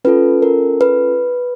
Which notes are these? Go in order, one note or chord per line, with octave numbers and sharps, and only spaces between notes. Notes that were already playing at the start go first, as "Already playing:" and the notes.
C#4 F4 A4 B4
A#4
B4